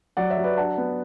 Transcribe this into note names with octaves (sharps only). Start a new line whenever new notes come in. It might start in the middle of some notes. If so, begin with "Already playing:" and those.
F#3 D5 F#5
C#5 E5
F#3
B4 D5
D4 F#5 A5
B3